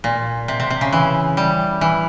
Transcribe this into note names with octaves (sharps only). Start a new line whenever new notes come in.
A#2
C3
C3
C3
C#3
E3
G3
E3